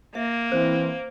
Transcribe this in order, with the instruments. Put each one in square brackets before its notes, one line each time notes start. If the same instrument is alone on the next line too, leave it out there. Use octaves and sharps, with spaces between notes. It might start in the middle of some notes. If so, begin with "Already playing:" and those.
[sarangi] A#3 [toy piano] E5
[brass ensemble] E3 C4 [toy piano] C5